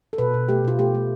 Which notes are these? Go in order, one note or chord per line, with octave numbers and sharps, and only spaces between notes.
A4
B2 B4
B2
A3 G4
B2 F4
A3 G4
A3